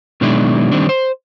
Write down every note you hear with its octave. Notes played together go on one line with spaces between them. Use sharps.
B2 D#3 F#3 G#3 D4 E4
D#3 G3 C4 D4
C5